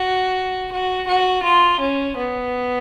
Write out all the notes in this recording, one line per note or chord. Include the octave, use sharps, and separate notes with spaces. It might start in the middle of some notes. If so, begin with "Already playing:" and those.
Already playing: F#4
F#4
F#4
F4
C#4
B3